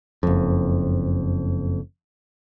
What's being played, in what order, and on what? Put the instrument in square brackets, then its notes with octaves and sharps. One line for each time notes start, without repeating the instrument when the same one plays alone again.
[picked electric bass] F#1 F2